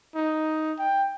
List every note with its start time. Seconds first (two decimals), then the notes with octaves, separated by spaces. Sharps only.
0.15 D#4
0.79 G5